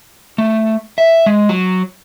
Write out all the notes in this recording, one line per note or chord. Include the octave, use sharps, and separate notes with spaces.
A3
E5
G#3
F#3